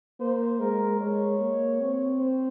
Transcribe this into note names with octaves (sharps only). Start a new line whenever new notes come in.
A#3 C5
G#3 A#4
G#3 C#5
A#3
C4
C5